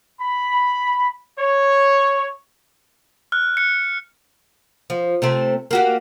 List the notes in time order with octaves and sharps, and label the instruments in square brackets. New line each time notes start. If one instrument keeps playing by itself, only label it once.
[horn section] B5
C#5
[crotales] F6 F#6
F#6 C#7
[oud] F3
C3 A3 C4
A#3 F#4 G4